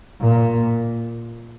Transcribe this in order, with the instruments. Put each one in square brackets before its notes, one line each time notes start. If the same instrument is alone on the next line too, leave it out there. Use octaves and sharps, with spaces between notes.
[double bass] A#2